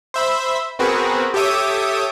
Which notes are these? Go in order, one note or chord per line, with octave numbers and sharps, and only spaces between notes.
C5 E5 B5
B3 C4 F#4 G#4 A#4 B4
G4 A4 C#5 E5 D6 D#6